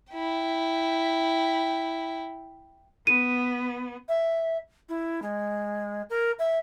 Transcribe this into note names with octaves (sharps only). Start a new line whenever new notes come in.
E4 G5
B3 D#7
E5
E4
G#3
A#4
E5